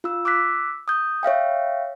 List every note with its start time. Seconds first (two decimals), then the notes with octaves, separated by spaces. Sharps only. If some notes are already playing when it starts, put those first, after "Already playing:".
0.04 F4 E6
0.25 D6 E6 F#6 B6
0.88 D#6 G6
1.23 C#5 E5 F5 G5